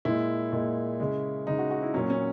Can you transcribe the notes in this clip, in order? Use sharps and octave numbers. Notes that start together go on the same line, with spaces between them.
A#2 G#3 E4
A#2 G#3
C#3 G#3
C#3 G#3 D#4
F#4
F#4
E4
A#2 F#3 C#4
C#4